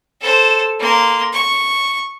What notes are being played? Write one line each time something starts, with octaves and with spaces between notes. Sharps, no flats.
A4 C5
A#3 C6
C#6